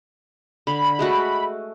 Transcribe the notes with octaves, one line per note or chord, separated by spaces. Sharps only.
D3 B5
G#3 A3 F#4